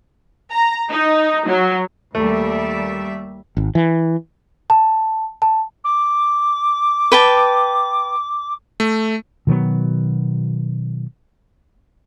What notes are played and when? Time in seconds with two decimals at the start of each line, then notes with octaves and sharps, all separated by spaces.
0.51 A#5
0.89 D#4
1.47 F#3
2.15 D#2 G3 A3 E5
3.57 G#1
3.75 E3
4.70 A5
5.42 A5
5.84 D6
7.12 B4 G5 A5
8.80 A3
9.47 B2 D#3 F#3 B3